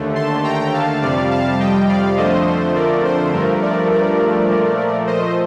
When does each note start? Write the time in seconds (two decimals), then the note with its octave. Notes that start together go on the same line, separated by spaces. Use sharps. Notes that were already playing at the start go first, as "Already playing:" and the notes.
Already playing: D#2 D3 A3
0.15 A5 C6
0.44 G5 A#5
0.74 F5 A5
1.02 F2 C3 G3 D5 F5
1.31 F5 A5
1.60 D#5 G5
1.89 D5 F5
2.18 F2 D3 F3 A3 C5 D#5
2.46 C5
2.76 A#4 D5
3.05 C5
3.33 G2 F3 A3 A#4
3.62 A#4 D5
3.91 A#4 D5
4.49 A#2 F3 A3
5.07 C5 D#5